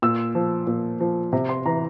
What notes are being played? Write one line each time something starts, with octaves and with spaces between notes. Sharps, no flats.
A#2 E6
F3
A#2
F3
C3
C6
E3 A#5